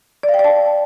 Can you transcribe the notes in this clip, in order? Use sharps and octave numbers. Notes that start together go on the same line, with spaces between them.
D5
F5
G5
D5
A5